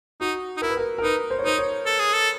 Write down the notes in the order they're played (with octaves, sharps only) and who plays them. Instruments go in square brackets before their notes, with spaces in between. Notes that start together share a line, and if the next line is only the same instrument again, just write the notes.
[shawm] D#4 [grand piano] F#4
[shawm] D#4
[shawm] E4 [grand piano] A#4
[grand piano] B4
A#4
A#4
[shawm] D#4 [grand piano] B4
[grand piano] C5
C#5
[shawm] D#4 [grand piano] C5
[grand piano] C#5
[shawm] A4
G#4
A4